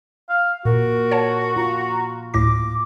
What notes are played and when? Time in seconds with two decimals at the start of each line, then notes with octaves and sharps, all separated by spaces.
0.29 F5
0.65 A#2 F#4 A#4
1.11 C#5 F#5 A5
1.56 F4 A#5
2.34 D2 A2 D6 A#6